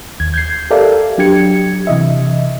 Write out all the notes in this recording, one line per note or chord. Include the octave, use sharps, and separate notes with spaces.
D#2 G#6
G6 G#6 C7
G4 A4 A#4 D5 E5 F5
F#3 D4 G4 G#6 C#7
C3 E3 D#5 E5